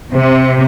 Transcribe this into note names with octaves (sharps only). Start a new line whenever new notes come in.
C3